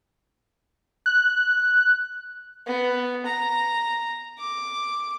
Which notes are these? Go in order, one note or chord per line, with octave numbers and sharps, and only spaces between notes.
F#6
B3
A#5
D6